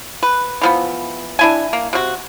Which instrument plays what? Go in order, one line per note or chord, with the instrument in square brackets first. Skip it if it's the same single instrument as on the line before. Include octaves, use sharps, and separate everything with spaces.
[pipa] B4
E3 F3 B3
D4 E4 G#5
A#3
C3 F#4